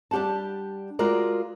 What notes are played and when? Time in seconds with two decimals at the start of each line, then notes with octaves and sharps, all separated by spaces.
0.11 G3 D4 G4 F#5 A5
0.99 G#3 F4 F#4 A#4 D5